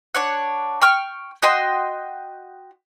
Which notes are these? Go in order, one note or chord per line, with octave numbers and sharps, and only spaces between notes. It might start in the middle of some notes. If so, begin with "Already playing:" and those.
D4 C#5 F#5
G5 C#6 F6
F#4 D#5 G5 C6